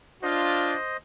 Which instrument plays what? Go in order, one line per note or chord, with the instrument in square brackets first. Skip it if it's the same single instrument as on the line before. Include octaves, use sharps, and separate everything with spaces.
[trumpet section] D4 F4 [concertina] C5 D#5